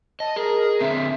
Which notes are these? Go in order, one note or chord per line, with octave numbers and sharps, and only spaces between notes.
D#5 A5
G#4 A#4
D3 C4 E5